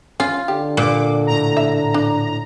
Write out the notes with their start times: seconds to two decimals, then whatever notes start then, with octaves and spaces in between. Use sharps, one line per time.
0.20 C#4 F4
0.48 D3 G4
0.77 A#2 D6
1.27 A2 A#5
1.57 E5
1.94 D4